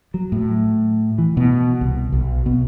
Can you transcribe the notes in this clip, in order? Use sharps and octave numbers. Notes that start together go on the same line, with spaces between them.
F#3
A2
E3
B2
C2
B1
B2